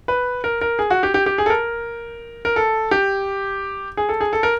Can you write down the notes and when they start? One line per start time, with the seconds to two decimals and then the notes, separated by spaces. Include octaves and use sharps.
0.08 B4
0.44 A#4
0.61 A#4
0.79 G#4
0.90 F#4
1.03 G4
1.14 G4
1.26 G4
1.38 G#4
1.46 A4
1.50 A#4
2.45 A#4
2.56 A4
2.91 G4
3.97 G#4
4.09 A4
4.21 G#4
4.33 A4
4.43 A#4